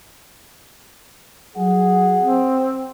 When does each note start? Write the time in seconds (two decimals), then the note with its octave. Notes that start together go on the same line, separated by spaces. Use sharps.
1.57 F#3 G#4 F#5
2.20 C4